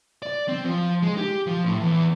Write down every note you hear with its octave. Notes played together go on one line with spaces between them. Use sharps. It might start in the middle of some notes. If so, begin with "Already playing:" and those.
D5
C4
F3
G#3
G4
F3
A2
E2